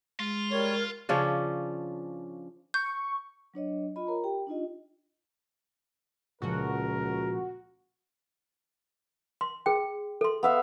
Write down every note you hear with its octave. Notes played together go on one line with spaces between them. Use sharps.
G#3 F4
G3 A#4 C#5
C#3 F3 C#4 D4
C#6 G6
F#3 D4 C#5 D#5
F4 D#5 B5
A#4 C#5 A#5
G4 G5
D4 D#4 F4 D#5
C#2 A#2 C#3 F3 F#4 A#4
C6
G#4 G5
A4 C6
B3 E5 F5